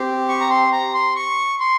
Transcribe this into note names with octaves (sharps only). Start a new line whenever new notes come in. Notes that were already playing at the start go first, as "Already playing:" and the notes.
Already playing: C4 G4
C#6
A#5
C6
A#5
C6
C#6
C6